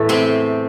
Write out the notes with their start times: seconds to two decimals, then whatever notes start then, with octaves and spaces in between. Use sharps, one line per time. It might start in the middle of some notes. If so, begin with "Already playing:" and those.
Already playing: E2 A2 E3 A3
0.09 C3 C4